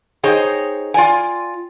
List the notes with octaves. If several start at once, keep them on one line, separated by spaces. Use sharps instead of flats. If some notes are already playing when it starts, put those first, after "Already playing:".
D#4 G#4 C5 C#5 D#5 G5
F4 D5 G5 G#5